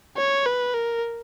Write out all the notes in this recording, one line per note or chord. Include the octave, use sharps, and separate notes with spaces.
C#5
B4
A#4